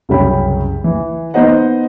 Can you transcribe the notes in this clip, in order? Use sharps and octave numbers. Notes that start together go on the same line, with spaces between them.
C2 F#2 C#3 C#4 G5 B5
E3
B3 D#4 C5 D#5 F#5